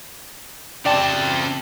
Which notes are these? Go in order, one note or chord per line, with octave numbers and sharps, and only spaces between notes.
C#3 C4 C5 D5 G5 A5